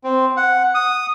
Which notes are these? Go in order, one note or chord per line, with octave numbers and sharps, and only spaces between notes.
C4
F#5
D#6